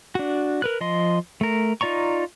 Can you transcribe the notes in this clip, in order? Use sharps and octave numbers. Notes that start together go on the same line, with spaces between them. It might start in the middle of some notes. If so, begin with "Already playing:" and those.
D4 F#4
A#4 B4 F#6
F3 D#5 C6
A3 A#4
D#4 F4 D5 A#5 C#6